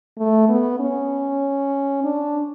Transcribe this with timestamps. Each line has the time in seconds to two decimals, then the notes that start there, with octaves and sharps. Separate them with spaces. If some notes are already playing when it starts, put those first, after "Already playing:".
0.18 A3
0.49 B3
0.80 C#4
2.04 D4